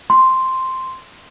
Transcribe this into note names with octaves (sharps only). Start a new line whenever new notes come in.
C6